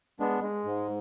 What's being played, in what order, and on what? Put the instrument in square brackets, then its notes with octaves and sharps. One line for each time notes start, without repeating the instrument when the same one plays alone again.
[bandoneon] G#3 B3 D4
G#3
G#2